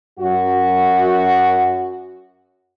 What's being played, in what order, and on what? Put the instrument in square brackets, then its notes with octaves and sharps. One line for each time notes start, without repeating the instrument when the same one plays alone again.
[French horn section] F#2 F#4